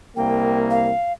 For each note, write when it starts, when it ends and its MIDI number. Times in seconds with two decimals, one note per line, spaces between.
0.16 0.90 36
0.16 0.90 58
0.16 0.57 79
0.70 1.13 77